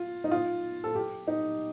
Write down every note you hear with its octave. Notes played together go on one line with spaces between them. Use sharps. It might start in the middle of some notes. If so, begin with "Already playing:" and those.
Already playing: F4
D#4
F4
A4
G4
D#4